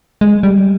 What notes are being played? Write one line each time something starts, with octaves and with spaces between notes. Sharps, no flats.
G#3
G3